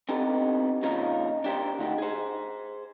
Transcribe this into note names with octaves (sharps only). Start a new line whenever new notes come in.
B3 C4 D4 D#4 G4 A4
A#2 C#3 F3 A#3 D#4 A#4
D4 G4 A#4 C5
D3 A3 D#4 F#4 G4
G#4 C5